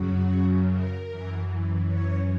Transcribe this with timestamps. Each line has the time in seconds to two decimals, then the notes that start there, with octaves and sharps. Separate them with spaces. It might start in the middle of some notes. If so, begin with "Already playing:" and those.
Already playing: F#2 C#3 F#3 F#4
0.72 A#4
1.09 F#2 E3
1.87 C#5